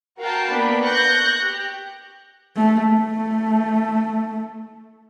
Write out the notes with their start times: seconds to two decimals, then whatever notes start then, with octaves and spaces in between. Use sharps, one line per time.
0.19 F#4 A#4 F5 G5 A5 A#5
0.49 A#3 B3 D4 B5
0.84 C#6 F#6 G6 A#6
1.44 G4
2.56 A3
2.92 A3